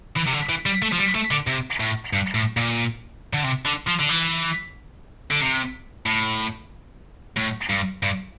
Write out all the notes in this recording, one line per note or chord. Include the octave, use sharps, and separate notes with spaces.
E3
C3
D3
E3
G3
A3
F3
G3
A3
D3
C3
A2
G2
A2
A#2
D3
C3
D3
F3
D3
E3
D3
C3
A2
A2
G2
G2